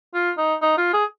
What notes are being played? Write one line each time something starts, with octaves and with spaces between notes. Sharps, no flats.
F4
D#4
D#4
F4
G#4